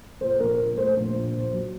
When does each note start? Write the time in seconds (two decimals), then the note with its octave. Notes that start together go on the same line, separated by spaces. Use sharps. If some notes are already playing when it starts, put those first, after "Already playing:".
0.21 A#2 C5
0.40 A#1 A#4
0.59 A#2
0.77 A3 C5
0.96 A#1
1.15 A#1
1.34 A#2
1.53 F#3